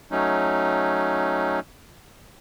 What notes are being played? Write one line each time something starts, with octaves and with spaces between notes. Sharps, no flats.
F#3 A3 C#4 D#4